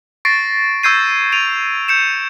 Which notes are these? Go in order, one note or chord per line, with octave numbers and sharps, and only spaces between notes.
C#6 A6 A#6 C7 D7
C#6 E6 G6 G#6 C7 D#7
D7 D#7 F7
G6 C#7 E7